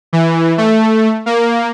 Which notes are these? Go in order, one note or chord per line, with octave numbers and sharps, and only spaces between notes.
E3
A3
A#3